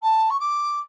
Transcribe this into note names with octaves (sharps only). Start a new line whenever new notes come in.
A5
C#6
D6